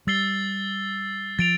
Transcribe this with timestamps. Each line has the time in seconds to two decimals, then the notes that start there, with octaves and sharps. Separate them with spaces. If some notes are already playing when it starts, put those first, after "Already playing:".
0.07 G3 E6 A6 C7 G7
1.39 F3 A6 D7 F7